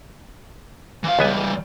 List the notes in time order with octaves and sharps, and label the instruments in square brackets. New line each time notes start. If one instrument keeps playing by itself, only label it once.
[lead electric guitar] E3 F5
[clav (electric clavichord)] C#2 B3 G#5 [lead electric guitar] E3 G3